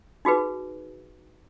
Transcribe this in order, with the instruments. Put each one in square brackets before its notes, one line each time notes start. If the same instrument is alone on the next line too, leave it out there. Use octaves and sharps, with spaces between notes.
[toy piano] D#4 F#4 G#4 B4